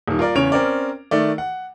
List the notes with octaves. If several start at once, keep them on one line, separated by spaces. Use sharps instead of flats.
D#1 D#3
F4 A#4 D5
E2 C#3 C#5 D7 F7
C4 C#4 A#4 D5
D#3 A3 D5
F#5